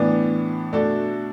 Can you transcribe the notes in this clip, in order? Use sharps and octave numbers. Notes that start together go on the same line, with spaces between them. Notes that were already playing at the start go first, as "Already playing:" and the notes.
Already playing: A2 E3 B3 D4
B2 A3 D4 F#4 A4